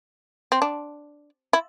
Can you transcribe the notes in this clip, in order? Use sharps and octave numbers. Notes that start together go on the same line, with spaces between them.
C4
D4
E4